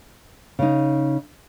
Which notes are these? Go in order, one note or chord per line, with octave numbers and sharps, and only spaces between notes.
C#3 D#4